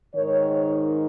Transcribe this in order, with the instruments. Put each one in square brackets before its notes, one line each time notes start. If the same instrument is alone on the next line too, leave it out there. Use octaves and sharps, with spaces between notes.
[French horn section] G#2 D#3 C#5